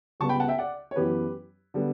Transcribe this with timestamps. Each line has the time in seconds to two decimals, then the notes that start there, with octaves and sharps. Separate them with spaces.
0.20 C#2 C#3 G3 B3 A5 C#6
0.29 G5 B5
0.40 F#5 A5
0.48 E5 G5
0.58 D5 F#5
0.91 C#5
0.96 F#2 E3 B3 G4 B4
1.74 D3 G3 B3